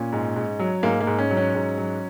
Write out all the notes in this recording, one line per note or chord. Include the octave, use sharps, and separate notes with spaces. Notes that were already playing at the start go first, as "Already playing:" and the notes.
Already playing: A#2 C#4
G#2
G#2
F#3
G#2 A#3
A#3
G#2
C#4
F#3
C#4
G#2
F#3